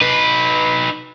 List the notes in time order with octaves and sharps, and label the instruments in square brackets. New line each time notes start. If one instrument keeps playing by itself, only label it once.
[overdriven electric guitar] D#4 B4